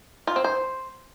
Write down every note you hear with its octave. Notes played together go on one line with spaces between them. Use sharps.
F4
C4
C5